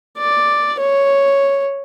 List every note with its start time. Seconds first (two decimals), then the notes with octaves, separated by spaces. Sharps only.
0.17 D5
0.80 C#5